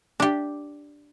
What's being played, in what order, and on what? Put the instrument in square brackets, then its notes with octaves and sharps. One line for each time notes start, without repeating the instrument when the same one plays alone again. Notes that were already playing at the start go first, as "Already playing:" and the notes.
[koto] D4 G4